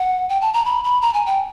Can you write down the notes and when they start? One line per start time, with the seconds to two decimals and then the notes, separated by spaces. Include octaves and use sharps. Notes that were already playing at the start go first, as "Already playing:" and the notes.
Already playing: F#5
0.29 G5
0.41 A5
0.54 A#5
0.65 B5
0.84 B5
1.02 A#5
1.14 G#5
1.26 G5